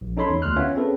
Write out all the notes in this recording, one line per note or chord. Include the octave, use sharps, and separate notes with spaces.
A#1
C#4 D#4 A4 C#5 B5 C6
E2
D2 C6 F6 F#6
B3 C#4 F4 C#5 E5
C4 C#4 G#4 A4 B4